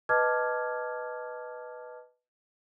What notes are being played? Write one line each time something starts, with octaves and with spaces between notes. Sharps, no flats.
B4 D#5 A5 D6 F6 G#6